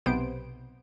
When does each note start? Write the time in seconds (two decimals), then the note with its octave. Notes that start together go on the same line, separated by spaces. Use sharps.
0.06 B1 C3 B3 C5 D7